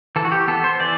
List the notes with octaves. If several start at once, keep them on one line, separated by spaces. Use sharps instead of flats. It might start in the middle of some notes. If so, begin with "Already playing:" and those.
E3 A4
F#4
G4
B3 A4
C5
E3 D5